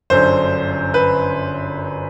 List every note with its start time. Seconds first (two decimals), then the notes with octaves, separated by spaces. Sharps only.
0.10 G1 F#2 D3 C5
0.94 B4